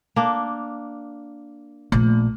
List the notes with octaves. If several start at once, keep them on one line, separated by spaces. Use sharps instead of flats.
A#3 D4
A#1 A3